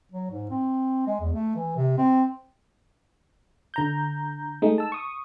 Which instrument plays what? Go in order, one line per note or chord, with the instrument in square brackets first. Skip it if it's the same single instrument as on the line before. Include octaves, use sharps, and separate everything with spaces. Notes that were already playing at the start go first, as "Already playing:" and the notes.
[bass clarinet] F#3
G#2
C4
G#3
E2
A3
E3
C3
C4
[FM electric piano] D3 A#5 G6
G#3 A3 D#4
A5 E6
C#6 D#6